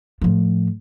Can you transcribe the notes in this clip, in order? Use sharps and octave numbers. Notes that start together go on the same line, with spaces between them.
A2 F3